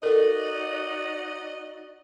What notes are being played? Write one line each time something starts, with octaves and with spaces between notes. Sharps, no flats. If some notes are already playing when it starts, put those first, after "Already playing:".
D#4 F#4 A4 A#4 D5 D#5